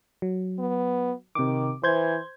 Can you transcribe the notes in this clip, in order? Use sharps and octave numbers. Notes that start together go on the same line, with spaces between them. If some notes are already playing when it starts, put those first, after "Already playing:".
F#3
B3
C3 D#3 D6
E3 C5 G6 G#6